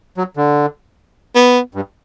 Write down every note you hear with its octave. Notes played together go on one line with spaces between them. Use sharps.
F#3
D3
B3
G2